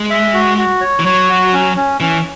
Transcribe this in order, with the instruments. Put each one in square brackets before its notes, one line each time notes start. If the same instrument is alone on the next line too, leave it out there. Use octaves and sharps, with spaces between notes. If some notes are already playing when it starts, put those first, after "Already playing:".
Already playing: [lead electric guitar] G#3
[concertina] E5
F#4
F#4
C#5
[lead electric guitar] E3
[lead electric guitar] F#3 [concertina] C#5
[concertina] F#4
C#4
C#4
[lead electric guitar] E3 [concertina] C#4